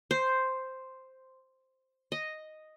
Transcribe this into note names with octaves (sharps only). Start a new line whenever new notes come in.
C5
D#5